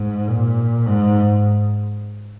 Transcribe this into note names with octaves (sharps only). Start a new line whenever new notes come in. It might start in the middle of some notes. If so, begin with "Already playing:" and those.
Already playing: G#2
A#2
G#2